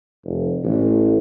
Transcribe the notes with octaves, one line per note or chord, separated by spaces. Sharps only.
F1
A1